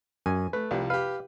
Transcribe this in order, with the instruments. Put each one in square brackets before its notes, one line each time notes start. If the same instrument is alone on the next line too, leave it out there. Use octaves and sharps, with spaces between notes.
[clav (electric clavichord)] F#2 [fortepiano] G#5
[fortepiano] A3 [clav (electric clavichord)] B4
[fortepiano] C2 F3 G3
[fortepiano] G4 B4 [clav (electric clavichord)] F5